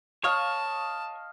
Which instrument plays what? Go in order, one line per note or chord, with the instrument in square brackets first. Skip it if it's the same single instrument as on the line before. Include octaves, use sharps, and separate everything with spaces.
[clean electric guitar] C#5 [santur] D#5 F5 C#6 [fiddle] A5